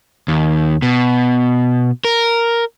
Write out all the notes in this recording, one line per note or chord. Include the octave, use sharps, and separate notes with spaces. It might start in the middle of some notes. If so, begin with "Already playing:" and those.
D#2
B2
A#4